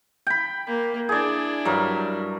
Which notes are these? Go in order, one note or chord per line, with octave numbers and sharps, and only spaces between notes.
G5 B5
A#3
D4 E4 G#4 D5
G2 F#3 A#4